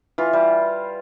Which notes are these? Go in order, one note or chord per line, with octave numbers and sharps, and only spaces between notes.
E3 F4
G3